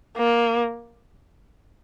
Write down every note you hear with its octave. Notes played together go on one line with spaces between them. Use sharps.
A#3